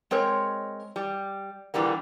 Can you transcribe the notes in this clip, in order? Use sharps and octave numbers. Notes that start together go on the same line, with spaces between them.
G#3 C4 A#4 C#5
G3
A#2 D3 E3 G3 A#3